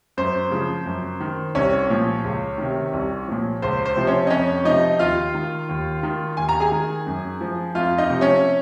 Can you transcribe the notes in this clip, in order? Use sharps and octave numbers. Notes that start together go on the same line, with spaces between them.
F#2 C5
C#3 F3
F#2
D#3
C2 C#4 C#5
A#2 F3
C#2
C3 D#3
C2
A#2 F3
C#2 C5
C5
C3 F3
C#4 C#5
D#5
F2 C#4 C#5
C3 F3 D#4 D#5
D#2 F4 F5
D#3
D#2
D#3
D#2 G#5
A#5
G#4 G#5
D#3
F#2
F3
F2 F4 F5
D#4 D#5
C3 F3
C#4 C#5